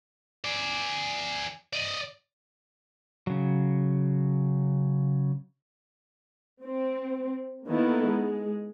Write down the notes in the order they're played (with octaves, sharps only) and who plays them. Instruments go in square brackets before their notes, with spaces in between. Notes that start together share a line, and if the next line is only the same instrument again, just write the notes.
[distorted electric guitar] G#4 D5
D5 D#5
[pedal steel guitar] C#3 F#3
[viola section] C4
D#3 A#3 B3 E4 A4
G#3